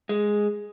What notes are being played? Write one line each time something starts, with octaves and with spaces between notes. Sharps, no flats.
G#3